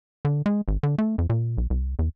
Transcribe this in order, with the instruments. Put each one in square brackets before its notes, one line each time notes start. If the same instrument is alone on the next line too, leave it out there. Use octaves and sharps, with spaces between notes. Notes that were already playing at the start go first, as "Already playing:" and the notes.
[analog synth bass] D3
G#3
G#1
D3
A3
F2
A#2
B1
C2
E2